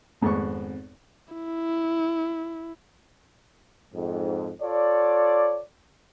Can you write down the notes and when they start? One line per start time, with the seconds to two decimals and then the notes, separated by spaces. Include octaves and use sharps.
0.21 G#1 F2 G#3 B3 C4 C#6
1.34 E4
3.95 F2 G#2
4.62 F4 A4 C#5 D5